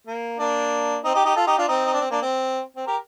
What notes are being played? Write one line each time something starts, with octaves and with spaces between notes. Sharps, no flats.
A#3
A#3 D4
C4 D#4
D#4 G4
D#4 G4
F4 A4
D#4 G4
D4 F4
C4 D#4
D#4
D4
C4
A#3 D4
C4
C4
G4 A#4